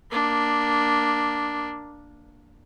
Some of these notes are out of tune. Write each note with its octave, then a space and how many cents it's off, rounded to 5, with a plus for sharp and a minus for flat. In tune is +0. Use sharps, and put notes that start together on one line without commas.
A#3 +5 D4 +0